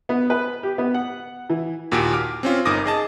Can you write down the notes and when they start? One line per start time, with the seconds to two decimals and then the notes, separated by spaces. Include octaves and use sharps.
0.09 B3
0.30 B4
0.63 G4
0.78 B3
0.94 F#5
1.50 E3
1.92 D#2 A#2 F#4 G4 G#5 D7
2.13 D6 F6
2.43 C4 C#4 F4
2.65 G1 D#4 A#4 D6 D#6 A#6
2.86 G#4 D#5 A5